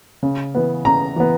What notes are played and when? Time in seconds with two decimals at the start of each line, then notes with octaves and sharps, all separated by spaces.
0.23 C#3
0.55 E3 B3
0.85 C#3 A#5
1.16 E3 B3